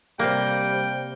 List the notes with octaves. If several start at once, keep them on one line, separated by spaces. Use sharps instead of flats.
C3 G3 A#3 G5